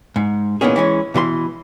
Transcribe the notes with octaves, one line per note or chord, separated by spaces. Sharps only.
G#2
A#2 D#3 E3 B3 C#4 G#4
E3 G#3 C#4 C#5
B2 E3 D#5 C6